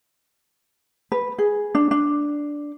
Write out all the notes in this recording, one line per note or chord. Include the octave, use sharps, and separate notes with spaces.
B4
G#4
D4
D4